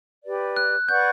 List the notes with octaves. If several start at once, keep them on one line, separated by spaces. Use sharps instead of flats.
G4 B4 D5
F#6
B4 D5 F#5 C#6 G6